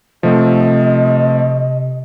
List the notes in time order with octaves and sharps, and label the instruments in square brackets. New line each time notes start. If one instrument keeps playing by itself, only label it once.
[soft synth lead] C3 [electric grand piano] F3 A3 C4 [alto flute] D#5